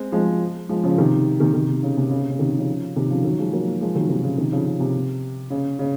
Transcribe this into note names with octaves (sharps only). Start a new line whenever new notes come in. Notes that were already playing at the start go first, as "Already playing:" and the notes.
Already playing: G#3 C4
F3 G#3
F3 G#3
C#3 F3
C3 D#3
C3 D#3
C3 D#3
C#3
C3
C#3
C3
C#3
C3 D#3
C#3 F3
C3 D#3
C#3 F3
D#3 F#3
F3 G#3
F#3 A#3
F3 G#3
D#3 F#3
C3 D#3
C#3
C3 D#3
C#3 F3
C#3
C3
C#3
C#3